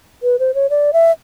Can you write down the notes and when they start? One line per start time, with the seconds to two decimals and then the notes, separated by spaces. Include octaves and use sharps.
0.23 B4
0.39 C5
0.54 C#5
0.70 D5
0.93 E5